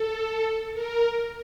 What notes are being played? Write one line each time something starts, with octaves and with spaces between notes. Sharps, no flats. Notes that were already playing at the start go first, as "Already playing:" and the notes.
Already playing: A4
A#4